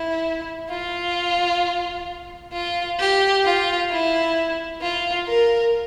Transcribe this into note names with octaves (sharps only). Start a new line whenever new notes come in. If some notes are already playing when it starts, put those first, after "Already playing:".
Already playing: E4
F4
F4
G4
F4
E4
F4
A#4